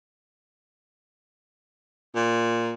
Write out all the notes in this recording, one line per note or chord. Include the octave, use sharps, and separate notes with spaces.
A#2